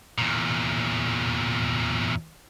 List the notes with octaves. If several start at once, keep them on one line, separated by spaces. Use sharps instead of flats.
E2 A#2